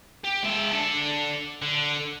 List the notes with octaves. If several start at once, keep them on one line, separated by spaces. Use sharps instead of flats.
G4
G#3 E5
D4 A4
D3